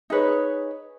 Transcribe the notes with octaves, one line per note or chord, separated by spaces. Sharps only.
D#4 G#4 B4 C#5